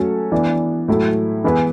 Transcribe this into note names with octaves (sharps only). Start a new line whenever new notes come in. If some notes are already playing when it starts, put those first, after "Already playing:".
Already playing: F#3 A3 C#4 F#4 A4
E3 B3 D4
A2 F#3 A3 E4
E3 B3 E4 G#4 B4